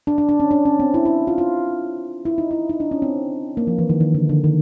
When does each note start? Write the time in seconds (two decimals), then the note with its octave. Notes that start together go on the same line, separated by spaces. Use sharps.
0.07 D4
0.18 D4
0.29 D4
0.40 C#4
0.51 D4
0.65 C#4
0.79 C4
0.94 E4
1.05 E4
1.27 F4
1.38 F4
2.25 E4
2.38 D#4
2.51 E4
2.69 D#4
2.80 D4
2.91 C#4
3.02 C4
3.57 A#3
3.67 F3
3.79 E3
3.89 D#3
4.01 D#3
4.14 D3
4.29 D3
4.44 D#3